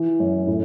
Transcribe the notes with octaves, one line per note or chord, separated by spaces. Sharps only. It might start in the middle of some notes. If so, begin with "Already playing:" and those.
Already playing: E3
F#2
A2